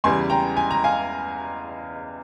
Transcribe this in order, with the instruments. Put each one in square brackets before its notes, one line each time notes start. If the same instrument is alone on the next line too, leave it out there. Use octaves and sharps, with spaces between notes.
[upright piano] E2 C#3 E3 G3 G#5 C6
G5 A#5
G#5
A#5
F5 G#5